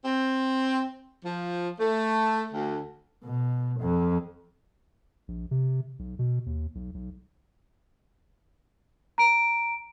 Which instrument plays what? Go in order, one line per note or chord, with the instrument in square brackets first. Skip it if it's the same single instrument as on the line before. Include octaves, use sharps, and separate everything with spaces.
[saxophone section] C4
F3
A3
D2
[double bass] B2
F2
[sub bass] A#1
C3
B1
B2
D#2
B1
B1
[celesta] A#5 D7